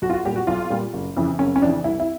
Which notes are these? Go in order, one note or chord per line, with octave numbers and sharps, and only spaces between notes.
B1 F#4
F4
F#4
A#2 G3 G4
F#4
B1 F4
A#2 G3
F#1
F2 C#3 E3
F#1 C#4
C#4
F2 C#3 E3 D4
C2 E4
E4